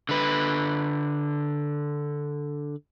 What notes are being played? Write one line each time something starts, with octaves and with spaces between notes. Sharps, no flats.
D3 B4